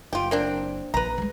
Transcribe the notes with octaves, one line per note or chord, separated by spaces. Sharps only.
F#1 F4 G4
A#3 C4 D4
A#1 F3 B4 A#5
E3 G#3